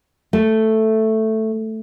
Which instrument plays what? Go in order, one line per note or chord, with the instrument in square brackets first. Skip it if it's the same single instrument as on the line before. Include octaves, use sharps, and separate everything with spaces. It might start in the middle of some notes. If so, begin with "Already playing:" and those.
[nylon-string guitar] A3